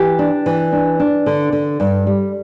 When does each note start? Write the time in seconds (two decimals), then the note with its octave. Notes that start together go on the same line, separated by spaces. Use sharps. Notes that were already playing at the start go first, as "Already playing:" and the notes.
Already playing: E3 G4
0.19 D4
0.46 E3
0.72 D4
1.00 D4
1.26 D3
1.53 D3
1.80 G2
2.07 G3